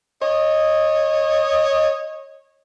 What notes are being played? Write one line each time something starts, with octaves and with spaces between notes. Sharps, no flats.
C#5 D#5